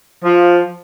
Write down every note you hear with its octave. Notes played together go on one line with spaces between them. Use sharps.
F3